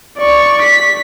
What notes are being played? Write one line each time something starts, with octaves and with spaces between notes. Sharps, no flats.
D5 C#6
B6